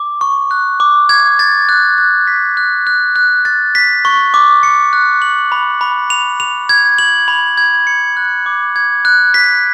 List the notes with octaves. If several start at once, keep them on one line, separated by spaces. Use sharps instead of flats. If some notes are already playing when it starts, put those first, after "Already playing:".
Already playing: D6
C#6
F#6
D6
G#6
A6
F#6
F#6
B6
F#6
F#6
F#6
A6
B6
C#6
D6
C#7
F#6
F#7
B5
B5
F7
F7
G#6
F#7
B5
G#6
C#7
F#6
D6
G#6
F#6
B6